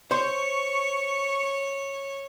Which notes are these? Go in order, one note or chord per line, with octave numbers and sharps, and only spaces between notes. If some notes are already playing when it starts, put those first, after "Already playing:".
C5 C#5 C6 C#6